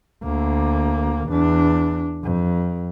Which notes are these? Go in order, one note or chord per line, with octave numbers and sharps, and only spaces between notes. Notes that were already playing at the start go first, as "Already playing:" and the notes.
D2 A#3
E2 D4
F2